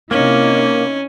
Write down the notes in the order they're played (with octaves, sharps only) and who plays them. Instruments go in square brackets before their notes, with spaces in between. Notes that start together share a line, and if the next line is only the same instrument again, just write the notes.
[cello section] C3 D#4 E4 [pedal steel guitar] A#3 [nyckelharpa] C#4